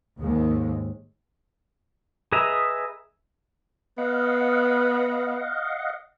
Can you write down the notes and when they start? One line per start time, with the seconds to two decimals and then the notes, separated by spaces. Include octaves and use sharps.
0.20 D#2 G#2 G#3
2.32 G#4 B4 D#5 E5 A#5
3.98 B3 D#5 F5 F#5